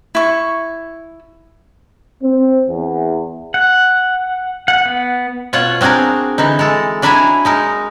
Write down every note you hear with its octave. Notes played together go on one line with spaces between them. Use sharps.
E4 C#6
C4
E2
F#5
F#5
B3
B2 F4 C#5 F#5
C4 D4 F#4 G#4 A#4
D3 E3 D#4
G#3 A4
F#3 D4 E4 E5 G#5 A#5
G#3 D#4 A#4